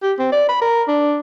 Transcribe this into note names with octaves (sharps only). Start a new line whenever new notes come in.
G4
C4
D5
B5
A#4
D4